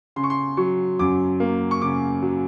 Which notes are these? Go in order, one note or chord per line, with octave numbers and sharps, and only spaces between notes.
C#3 C6
C#6
C6
F#3 C#6
F#2 D6
A#3
C#6
C#3 D6
F#3